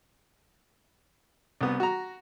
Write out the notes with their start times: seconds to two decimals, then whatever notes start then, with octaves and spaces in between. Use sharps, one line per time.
1.61 C2 B3
1.80 F#4 A#5